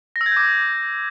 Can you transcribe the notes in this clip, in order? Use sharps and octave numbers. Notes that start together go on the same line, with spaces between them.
A#6
E6
G#6
G6
D6